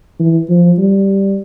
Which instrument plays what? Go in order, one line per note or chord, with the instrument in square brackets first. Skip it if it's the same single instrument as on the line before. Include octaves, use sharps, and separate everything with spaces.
[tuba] E3
F3
G3